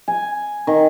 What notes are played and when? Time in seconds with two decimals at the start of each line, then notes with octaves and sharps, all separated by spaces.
0.08 G#5
0.67 D#3